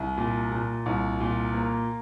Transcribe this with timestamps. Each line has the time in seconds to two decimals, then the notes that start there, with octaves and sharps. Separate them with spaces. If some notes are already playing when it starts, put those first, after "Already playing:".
Already playing: C2
0.18 A#2
0.52 A#2
0.86 C2
1.20 A#2
1.54 A#3